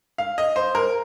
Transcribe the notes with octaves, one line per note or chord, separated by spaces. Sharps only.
F5
D#5
C5
A#4